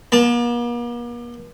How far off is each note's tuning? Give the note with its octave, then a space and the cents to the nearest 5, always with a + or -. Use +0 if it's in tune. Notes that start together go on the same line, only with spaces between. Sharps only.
A#3 +45 A5 +0